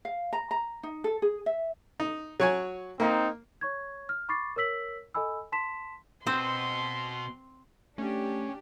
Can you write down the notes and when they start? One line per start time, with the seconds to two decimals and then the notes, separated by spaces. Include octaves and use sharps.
0.05 F5
0.33 A#5
0.51 A#5
0.83 D#4
1.04 A4
1.22 G#4
1.46 E5
2.00 D#4
2.40 F#3 C#5 G#5
3.00 A#3 C4 D#4
3.61 C#5 C#6 G#6
4.09 F6
4.29 B5 C#6 D6 A6 C7
4.56 A#4 C#5 E6 B6 F#7
5.14 A4 D#5 G#5 B5 E6
5.52 A5 C6 B6 E7
6.27 B2 B3 C4 C5 C6
7.98 A3 C#4 D4 G4